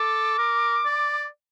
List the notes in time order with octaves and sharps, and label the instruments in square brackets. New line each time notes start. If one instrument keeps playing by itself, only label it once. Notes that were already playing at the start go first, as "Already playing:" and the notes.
Already playing: [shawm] A4 [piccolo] D6
[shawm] A#4
D5